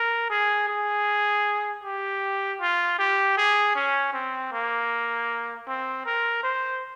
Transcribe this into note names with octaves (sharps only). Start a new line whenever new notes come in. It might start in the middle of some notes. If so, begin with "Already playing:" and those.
Already playing: A#4
G#4
G#4
G4
F4
G4
G#4
C#4
C4
A#3
C4
A#4
C5